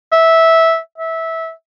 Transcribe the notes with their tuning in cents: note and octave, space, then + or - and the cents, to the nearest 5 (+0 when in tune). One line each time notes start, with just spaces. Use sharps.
E5 -10
E5 -15